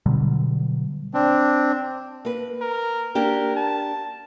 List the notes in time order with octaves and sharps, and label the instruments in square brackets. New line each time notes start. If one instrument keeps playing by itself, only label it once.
[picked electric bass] B2 D3 F#3 G3
[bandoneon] C4 D4
[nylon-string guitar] A#3 B4
[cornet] A#4
[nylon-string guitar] A#3 D4 G4 [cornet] A#4
[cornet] A5